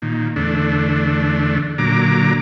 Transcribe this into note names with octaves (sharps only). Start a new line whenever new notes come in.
A#2 D#3
E2 D3 A3 D4
A#2 D3 F#3 A#5 D6